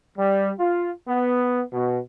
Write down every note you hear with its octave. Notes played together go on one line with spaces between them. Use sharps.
G3
F4
B3
B2